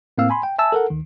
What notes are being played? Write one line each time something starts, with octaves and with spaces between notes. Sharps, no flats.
A2 A#3 C4 F5 E6
G#5 B5 C6
G5
E5 G#5 A5 E6
A4 A#4 F#5
D2 D#3